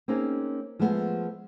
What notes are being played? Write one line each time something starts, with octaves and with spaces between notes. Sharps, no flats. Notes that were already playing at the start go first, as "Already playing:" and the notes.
A#3 C4 C#4 D#4 G#4
F3 G#3 A3 B3